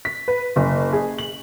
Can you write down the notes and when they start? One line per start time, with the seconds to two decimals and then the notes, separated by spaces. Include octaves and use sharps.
0.05 B6
0.28 B4
0.56 F#1
0.93 G#4
1.18 F#7